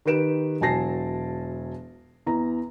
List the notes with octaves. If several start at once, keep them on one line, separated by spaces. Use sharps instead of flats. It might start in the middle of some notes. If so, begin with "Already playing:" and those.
D#3 G4 B4 D7 E7
E1 F#3 G#5 A5 A#6 C7
E2 A#5